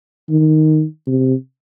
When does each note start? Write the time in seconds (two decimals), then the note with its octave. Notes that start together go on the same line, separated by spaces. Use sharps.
0.29 D#3
1.07 C3